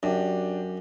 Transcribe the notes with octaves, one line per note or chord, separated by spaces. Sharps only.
F#2 D4 G4